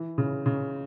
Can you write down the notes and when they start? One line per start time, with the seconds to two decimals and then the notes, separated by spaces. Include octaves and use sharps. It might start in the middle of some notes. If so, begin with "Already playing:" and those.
Already playing: E3
0.18 C#3
0.46 C#3